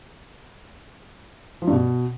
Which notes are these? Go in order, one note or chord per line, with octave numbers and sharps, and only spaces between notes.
F3
G2
B2